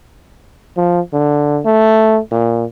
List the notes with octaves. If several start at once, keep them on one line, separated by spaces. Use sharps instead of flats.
F3
D3
A3
A#2